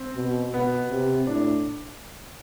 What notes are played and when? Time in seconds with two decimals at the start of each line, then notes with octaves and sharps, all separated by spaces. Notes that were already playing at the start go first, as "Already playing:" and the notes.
Already playing: C4
0.16 B2
0.53 B2 B3
0.90 C3
1.27 A2 D4